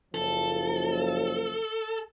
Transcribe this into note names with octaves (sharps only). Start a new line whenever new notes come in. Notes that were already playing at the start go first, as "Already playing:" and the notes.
F#1 F3 A4